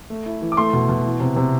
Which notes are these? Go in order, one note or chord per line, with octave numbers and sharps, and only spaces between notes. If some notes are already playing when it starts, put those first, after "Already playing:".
A3
E4
E3
D6
A3 C6
B2
B2
E3
C3
C3